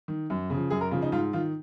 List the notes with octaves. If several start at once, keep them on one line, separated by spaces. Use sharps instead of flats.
D#3
F#2
C#3 F3
F#2 G#4
A#4
C#3 F3 F4
D#4
G#2 F4
D#3 F4